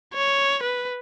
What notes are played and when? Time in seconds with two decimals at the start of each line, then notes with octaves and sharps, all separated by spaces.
0.14 C#5
0.63 B4